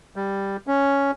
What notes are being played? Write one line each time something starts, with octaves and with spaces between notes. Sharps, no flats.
G3
C#4